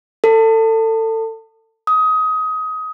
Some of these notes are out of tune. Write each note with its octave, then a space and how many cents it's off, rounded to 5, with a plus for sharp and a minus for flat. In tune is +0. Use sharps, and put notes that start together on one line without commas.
A4 +25
D#6 +20